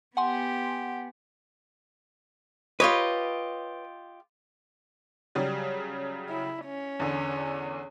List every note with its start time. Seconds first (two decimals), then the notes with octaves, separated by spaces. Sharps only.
0.17 B3 G4 F#5 G#5 C6
2.80 F4 G4 B4 C#5 D#5
5.35 C#3 F#3 G3
6.30 E4
6.65 C#4
7.00 E2 D3